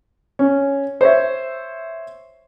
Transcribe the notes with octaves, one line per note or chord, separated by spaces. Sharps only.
C#4
C5 C#5 E5